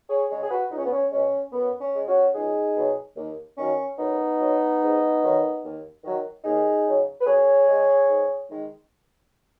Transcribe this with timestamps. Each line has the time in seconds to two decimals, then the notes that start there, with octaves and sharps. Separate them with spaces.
0.09 G#4 C#5
0.30 C#3 G#3 G#4 C#5
0.43 G#4
0.50 F#4 B4
0.71 C#2 D#4
0.78 C#4
0.85 B3
0.92 C#4
1.11 B2 G#3 C#4
1.53 F#2 B3
1.81 C#4
1.94 C#3 G#3
2.07 C#4 F#4
2.35 C#2 D#4 G#4
2.76 B2 F#3
3.16 D#2
3.57 D#3 F#3 C#4
3.99 F#2 B3 D#4
4.39 F#3
4.81 G#2
5.22 D#3 F#3
5.62 D#2
6.04 D#3 F#3
6.44 D#2 D#4 G#4
6.85 C#3 F#3
7.21 B4
7.26 F#2 G#4 C#5
7.67 C#3 G#3
8.08 G#2
8.50 D#3 G#3